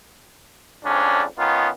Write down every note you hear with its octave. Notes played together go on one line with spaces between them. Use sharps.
F2 G#2 C#4 D4
D#3 B3 C#4 D#4 F4